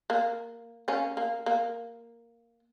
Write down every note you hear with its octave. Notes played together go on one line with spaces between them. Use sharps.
A#3
A#3 C#4
A#3
A#3